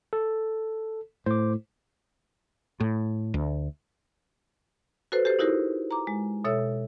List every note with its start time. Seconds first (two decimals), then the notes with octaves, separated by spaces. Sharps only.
0.13 A4
1.26 A2 C5 D6
2.80 A2
3.34 D2
5.12 F#4 A4 B4 C5
5.25 G4 A4 C5
5.39 D#4 E4 F#4 G4 A#4 C5
5.91 A#5 D6
6.07 G#3
6.44 B2 A4 C#5 E5 E6